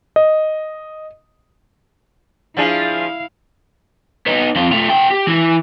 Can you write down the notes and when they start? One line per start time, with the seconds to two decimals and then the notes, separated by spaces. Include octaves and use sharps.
0.16 D#5
2.57 F3 D4 E4 G#4 F5
4.26 B3 D#4
4.56 F2 F4
4.72 A3 F4
4.89 B3 G5
5.11 G4
5.27 E3 E4